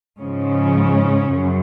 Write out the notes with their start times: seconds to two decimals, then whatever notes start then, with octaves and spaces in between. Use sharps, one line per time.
0.20 G#2 C#3 F3 C#4
1.32 F#2